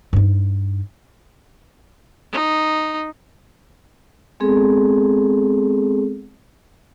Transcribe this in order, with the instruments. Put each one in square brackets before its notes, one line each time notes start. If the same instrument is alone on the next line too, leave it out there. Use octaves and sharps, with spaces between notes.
[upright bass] G2 D#4
[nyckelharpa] D#4
[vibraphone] G#3 B3 C4 G#4 A4